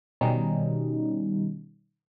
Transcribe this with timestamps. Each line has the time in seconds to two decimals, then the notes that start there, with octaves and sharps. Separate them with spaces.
0.21 B2 D#3 G3 C#4 D#4